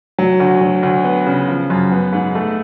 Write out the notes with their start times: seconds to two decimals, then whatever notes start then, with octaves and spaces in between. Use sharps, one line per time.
0.18 F#3
0.40 D2
0.61 F#3
0.83 D2
1.04 B3
1.26 C#3
1.47 F3
1.70 F#2
1.92 B3
2.13 G#2
2.35 A3